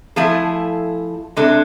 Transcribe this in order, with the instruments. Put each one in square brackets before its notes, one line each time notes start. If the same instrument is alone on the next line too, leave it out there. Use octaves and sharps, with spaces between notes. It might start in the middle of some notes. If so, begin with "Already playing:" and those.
[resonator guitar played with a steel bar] F3 A3 E4 G#4
C3 G#3 D4 A4